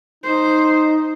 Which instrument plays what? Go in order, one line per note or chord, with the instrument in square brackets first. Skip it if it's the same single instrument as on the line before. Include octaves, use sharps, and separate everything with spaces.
[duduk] D#4 [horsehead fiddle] C5